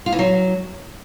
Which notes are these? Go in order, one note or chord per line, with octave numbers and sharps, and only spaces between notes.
F4
E3
F#3